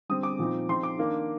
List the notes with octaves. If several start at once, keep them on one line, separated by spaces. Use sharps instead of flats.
D3 G3 C4 D#6
D6
A#2 F3 C4 D#4
F3 C4 D#4 C6
D6
D#3 A#3 D4